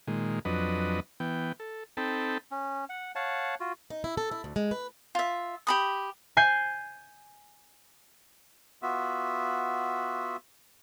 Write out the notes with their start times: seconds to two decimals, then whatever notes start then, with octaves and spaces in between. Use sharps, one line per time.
0.08 A#2 D#3 G#3
0.45 F2 F#3 D4 B4 D#5
1.20 E3 B3 G5
1.60 A4
1.97 C4 D#4 A4 G5 A5 B5
2.51 C#4
2.89 F#5
3.15 C#5 F5 F#5 A5
3.60 F4 F#4
3.90 D#4
4.04 E4
4.17 A4
4.31 E4
4.44 D2
4.56 G#3
4.71 B4
5.15 F4 E5
5.67 G4 B5 D#6
6.37 G#5 G6 C7
8.82 B3 F4 F#4 E5